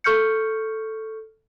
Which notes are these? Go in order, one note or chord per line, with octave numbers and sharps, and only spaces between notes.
A4 C#6 F6 G6 C#7